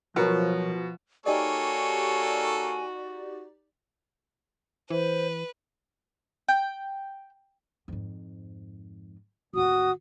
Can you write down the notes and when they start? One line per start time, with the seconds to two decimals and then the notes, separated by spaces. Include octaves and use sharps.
0.16 B2 F3 F#3 A#4 C#5
1.26 A#3 D#4 F#4 G4 A4 C#5 D5 G#5
4.90 E3 B4 C5
6.49 G5
7.88 F2 G#2
9.53 A1 D#2 F#4 D#6